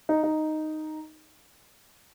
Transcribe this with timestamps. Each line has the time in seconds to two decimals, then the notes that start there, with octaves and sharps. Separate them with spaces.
0.09 D#4
0.23 D#4